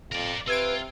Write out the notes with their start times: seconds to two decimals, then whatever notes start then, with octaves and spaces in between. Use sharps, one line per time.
0.12 F2 A#4 D5
0.48 C3 F4 B4 E6 G#6 D7